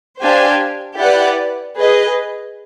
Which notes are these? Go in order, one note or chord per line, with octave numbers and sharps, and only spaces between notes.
D4 G4 C5 F5 G#5
E4 G4 B4 D5 F#5
G#4 B4 D#5